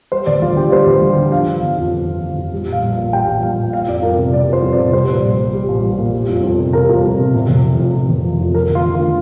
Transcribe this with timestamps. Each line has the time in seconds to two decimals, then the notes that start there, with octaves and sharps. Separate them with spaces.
0.12 G3 C5
0.26 D2 D5
0.42 D2 F4
0.56 D3 G4
0.72 G3 C5
0.86 D2
1.01 D2
1.17 D3
1.32 F3 F5
1.47 G1
1.62 G1
1.77 F2
1.92 F3
2.07 G1
2.22 G1
2.37 F2
2.53 G3
2.67 A#1
2.73 F5
2.82 A#1
2.93 F5
2.97 A#2
3.13 G3 G5
3.27 A#1
3.43 A#1 F5
3.57 A#2
3.73 G3 F5
3.88 F2 D5
4.02 F2 A#4
4.17 C3
4.33 G3 D5
4.48 F2 C5
4.63 F2
4.73 D5
4.78 C3
4.93 G3 C5
5.09 A#1
5.24 A#1
5.38 A#2
5.53 G3
5.68 A#1
5.84 A#1
5.98 A#2
6.13 G3
6.29 F2
6.44 F2
6.59 C3
6.73 G3 A#4
6.89 F2
7.05 F2
7.18 C3
7.34 C3
7.49 F1
7.64 F3
7.79 F2
7.94 C3
8.09 F1
8.24 F3
8.40 F2
8.54 F3 A#4
8.70 D2
8.75 F4
8.84 D2
8.95 F4
8.99 D3